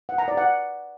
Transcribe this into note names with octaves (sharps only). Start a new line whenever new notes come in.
F#5
A#5
D5
F#5